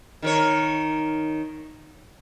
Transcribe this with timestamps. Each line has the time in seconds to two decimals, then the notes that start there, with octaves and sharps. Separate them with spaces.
0.22 D#3 A#4 C#5